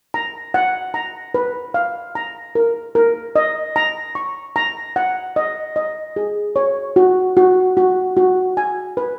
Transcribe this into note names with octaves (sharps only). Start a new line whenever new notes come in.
A#5
F#5
A#5
B4
F5
A#5
A#4
A#4
D#5
A#5
C#6
A#5
F#5
D#5
D#5
G#4
C#5
F#4
F#4
F#4
F#4
G#5
B4